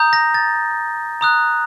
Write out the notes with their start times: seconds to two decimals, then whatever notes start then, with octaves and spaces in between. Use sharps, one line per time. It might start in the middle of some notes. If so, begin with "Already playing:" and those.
Already playing: A#5 D#6 G6
0.13 A#6
0.34 A6
1.21 A#5 D#6 F#6